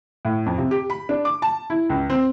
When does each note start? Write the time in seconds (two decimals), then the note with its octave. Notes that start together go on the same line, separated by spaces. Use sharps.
0.25 A2
0.46 F2
0.58 C3
0.71 G4
0.90 B5
1.09 D4
1.25 D6
1.42 A5
1.70 E4
1.90 C#2
2.10 C4